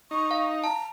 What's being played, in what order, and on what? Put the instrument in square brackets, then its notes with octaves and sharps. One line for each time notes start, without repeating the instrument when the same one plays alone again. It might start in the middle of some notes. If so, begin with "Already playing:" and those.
[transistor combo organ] D#4 [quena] C#6
[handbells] F5
[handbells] A5 [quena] A#5